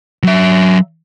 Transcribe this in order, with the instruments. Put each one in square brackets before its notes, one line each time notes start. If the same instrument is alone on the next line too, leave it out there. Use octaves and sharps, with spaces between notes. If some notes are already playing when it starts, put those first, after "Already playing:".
[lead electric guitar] F#3 E5